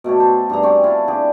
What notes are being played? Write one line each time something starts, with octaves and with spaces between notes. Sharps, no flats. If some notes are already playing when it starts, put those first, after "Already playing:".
B2 A3 G4 C#5
A4 C5
G2 G#4 A#5
C4 F#4 G5 C#6
E4 F4 A4
D3 G4 G#4